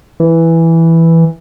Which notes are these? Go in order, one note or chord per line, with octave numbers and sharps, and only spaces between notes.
E3